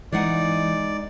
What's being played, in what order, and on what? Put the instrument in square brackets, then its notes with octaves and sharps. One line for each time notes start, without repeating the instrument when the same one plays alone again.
[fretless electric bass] E3 [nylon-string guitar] G#3 D#4 F#5 [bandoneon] D5